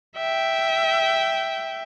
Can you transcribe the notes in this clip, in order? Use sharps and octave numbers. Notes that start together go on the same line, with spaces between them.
E5 G5